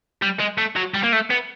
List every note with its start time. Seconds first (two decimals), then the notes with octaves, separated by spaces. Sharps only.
0.22 G3
0.40 G#3
0.58 A3
0.76 F#3
0.94 G3
1.03 A#3
1.13 A3
1.30 B3